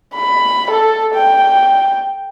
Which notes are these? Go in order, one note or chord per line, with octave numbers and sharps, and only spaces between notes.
B5
A4
G5